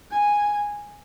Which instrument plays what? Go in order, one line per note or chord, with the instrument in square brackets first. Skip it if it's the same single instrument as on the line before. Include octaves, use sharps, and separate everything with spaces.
[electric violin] G#5